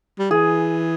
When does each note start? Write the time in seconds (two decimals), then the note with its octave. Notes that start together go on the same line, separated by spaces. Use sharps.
0.19 G3
0.31 E3 G#4